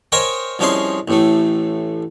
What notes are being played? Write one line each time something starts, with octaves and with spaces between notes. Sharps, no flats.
A#4 C5 C#5 D#5 G5 G#5
C2 F3 C#4 D#4 G#4 C6
A1 A2 A3